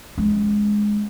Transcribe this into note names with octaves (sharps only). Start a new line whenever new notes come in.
G#3 C#4